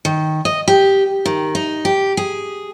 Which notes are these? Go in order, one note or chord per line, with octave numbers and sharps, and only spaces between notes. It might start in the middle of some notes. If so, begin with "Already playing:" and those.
D#3
D#5
G4
D#3
D#4
G4
G#4